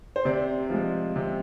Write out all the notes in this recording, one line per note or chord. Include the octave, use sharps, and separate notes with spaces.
C5
C3 D5
F3 G#3
C3